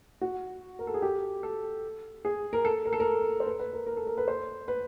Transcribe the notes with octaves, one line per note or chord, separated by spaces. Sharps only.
F#4
A#4
A4
G#4
G4
A4
G#4
A#4
A4
A#4
A4
A#4
C5
B4
B4
A#4
A#4
A4
A#4
B4
C5
B4